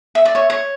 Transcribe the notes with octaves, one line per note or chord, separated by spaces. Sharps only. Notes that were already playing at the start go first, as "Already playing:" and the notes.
E5
D5
C#5 E5
C#5